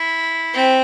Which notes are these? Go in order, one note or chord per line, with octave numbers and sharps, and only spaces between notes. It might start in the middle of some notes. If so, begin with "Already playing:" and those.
Already playing: E4
C4